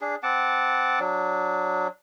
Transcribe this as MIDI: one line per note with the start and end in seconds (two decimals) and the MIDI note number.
0.01 0.15 62
0.01 0.15 68
0.23 0.99 60
0.23 0.99 78
0.23 0.99 81
0.23 0.99 86
1.00 1.88 54
1.00 1.88 62